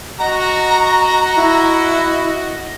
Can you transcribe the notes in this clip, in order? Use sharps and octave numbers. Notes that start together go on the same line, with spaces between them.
F#4 D#5 A#5
E4